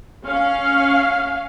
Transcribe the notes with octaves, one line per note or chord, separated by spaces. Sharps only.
C#4 F5